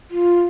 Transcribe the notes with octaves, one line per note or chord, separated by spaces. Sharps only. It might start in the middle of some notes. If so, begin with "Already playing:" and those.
F4